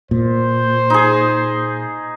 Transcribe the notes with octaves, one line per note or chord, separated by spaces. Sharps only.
A#2 C5
D#4 G#4